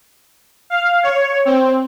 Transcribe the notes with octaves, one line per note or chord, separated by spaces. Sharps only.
F5
C#5
C4